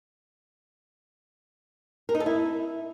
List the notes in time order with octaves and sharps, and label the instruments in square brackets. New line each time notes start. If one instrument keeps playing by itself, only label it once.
[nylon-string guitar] A#4
D#4
A4
E4